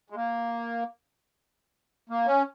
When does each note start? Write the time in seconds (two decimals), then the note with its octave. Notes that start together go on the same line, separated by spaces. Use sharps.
0.10 G#3
0.16 A#3
2.10 A#3
2.26 C#4